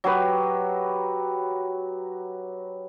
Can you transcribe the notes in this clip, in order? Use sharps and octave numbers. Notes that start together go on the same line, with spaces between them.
F#3 G4 B4